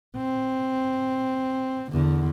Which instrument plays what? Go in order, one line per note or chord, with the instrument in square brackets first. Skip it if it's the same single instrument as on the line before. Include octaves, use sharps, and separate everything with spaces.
[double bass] C4
E2 D3